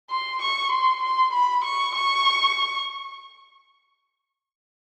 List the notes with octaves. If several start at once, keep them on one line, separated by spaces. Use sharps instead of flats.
C6
C#6
C6
C6
B5
C#6
C#6